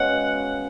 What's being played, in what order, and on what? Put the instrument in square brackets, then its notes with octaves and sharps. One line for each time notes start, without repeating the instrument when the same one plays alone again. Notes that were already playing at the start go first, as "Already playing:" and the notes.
Already playing: [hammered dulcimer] C#3 G#3 B3 F#4 [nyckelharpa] F#5